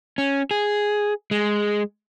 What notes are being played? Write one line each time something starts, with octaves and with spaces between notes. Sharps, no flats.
C#4
G#4
G#3